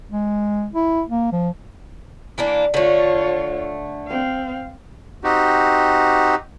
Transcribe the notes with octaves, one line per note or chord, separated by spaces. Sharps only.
G#3
E4
A#3
F3
E3 A#3 D4
D3 A3 F4 C#5
C4 F5
C4 D#4 F#4 G4